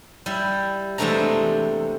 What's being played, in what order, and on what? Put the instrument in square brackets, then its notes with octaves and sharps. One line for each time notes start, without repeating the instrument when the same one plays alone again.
[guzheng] G3 E4
E2 C3 G#3 A3 D4 A#5